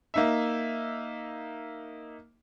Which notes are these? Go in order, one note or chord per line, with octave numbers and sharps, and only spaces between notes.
A#3 D#4 E5